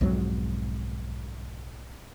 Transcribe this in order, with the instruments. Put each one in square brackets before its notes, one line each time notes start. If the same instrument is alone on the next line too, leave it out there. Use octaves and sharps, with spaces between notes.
[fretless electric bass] B1 F2 G#2 F#3